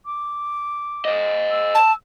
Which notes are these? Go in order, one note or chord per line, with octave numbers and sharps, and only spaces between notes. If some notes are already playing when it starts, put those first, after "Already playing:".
D6
C5 D#5
E6
A5